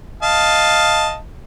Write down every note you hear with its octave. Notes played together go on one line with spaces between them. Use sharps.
D#5 F5 A5